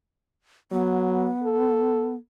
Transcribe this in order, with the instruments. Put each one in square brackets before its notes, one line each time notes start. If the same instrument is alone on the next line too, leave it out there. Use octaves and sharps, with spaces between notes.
[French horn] F#3 [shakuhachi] B3
[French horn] A4